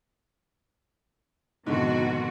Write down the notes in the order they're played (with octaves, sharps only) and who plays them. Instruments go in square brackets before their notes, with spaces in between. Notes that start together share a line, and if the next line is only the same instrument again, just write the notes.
[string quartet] F2 B2 [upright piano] G#2 D3 [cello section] D#3 F#4